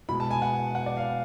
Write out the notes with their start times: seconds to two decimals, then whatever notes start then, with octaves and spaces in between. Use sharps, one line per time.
0.09 B2 G#3 B5
0.20 A5
0.31 G#5
0.42 F#5
0.75 F#5
0.86 D5
0.97 F5